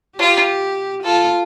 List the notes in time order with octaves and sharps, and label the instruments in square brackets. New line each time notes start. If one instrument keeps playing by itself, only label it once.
[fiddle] F4 [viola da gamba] G4
[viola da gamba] F4 [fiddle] A4